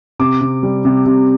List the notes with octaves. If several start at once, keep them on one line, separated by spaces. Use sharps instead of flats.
C3 D6
C3
G3
C3
C3